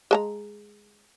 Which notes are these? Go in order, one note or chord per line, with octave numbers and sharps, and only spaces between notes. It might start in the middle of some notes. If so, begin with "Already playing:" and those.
G#3 A5 A#5